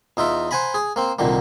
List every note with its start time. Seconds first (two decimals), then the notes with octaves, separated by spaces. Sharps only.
0.17 E2 D#4 F4 E5
0.51 C5 F#5 G#5 A#5 B5
0.74 G#4
0.96 A#3 C4
1.19 C2 A#2 D3 D#3 A#3